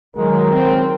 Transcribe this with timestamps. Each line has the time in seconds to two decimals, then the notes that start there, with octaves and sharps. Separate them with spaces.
0.16 D#3 F#3 G#3 A#4
0.51 C#2 C4